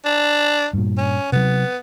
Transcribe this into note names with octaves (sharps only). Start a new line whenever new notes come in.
D4
G2 A#2
C#4
C3 F#3 B3